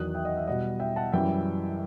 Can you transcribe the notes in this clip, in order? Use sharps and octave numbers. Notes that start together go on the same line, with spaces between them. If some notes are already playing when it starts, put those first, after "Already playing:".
Already playing: E2 D#3 F#3 D#6 F#6
E5 G5
D#5 F#5
E5
B2 G3 D#5 F#5
E5 G5
F#5 A5
F#2 E3 G3 E5 G5